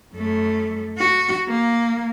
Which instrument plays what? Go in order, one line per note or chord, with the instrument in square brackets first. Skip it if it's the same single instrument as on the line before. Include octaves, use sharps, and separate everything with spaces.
[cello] F#2 A3
F#4
A#3